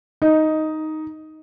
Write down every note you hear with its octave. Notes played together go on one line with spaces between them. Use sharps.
D#4